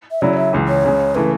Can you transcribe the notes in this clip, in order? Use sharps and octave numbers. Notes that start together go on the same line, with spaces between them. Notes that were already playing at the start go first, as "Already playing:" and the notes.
E5
C#3 F#3 C#4 E4 D5
E5
C#2 C#3 E3
C#5
C#2 C#3 G#3
C#3 E3 A3 B4